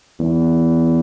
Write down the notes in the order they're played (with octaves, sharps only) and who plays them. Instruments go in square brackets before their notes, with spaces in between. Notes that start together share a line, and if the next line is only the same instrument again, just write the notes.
[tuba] E2